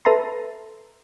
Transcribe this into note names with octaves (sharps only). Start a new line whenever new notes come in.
A4 B4 E5 A5 A#5 C6